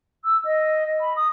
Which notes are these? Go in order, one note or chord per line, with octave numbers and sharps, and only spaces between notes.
E6
D#5
B5
D#6